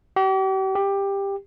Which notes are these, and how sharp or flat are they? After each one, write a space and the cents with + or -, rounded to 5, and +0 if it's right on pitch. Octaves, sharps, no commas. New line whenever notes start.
G4 -40
G4 +15